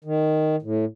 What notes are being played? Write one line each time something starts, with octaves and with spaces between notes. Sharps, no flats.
D#3
A2